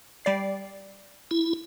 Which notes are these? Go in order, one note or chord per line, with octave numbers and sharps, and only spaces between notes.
G3 D5 C7
E4